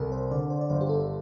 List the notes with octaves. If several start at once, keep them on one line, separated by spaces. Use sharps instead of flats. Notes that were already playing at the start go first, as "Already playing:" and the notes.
Already playing: C2 A4 A#4 D5
C5
D3 D5
C5
D5
G1 C5
G4
A4